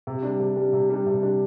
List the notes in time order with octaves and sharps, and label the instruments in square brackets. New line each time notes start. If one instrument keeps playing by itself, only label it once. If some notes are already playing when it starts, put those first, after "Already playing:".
[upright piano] C3
G3 D4
C3
G3 D4
C3
G3 D4
C3
G3 D4